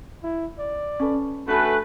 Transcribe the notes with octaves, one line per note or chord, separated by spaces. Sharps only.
E4
D5
C#4 A4 B4
A3 D4 F#4 A4 B4 G#5